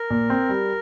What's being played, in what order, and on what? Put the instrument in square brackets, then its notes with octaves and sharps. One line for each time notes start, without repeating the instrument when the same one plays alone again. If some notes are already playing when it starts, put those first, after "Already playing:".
Already playing: [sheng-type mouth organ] A#4
[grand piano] A#2
C4
G3